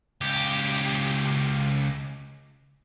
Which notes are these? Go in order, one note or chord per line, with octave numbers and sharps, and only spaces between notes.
C#2 G4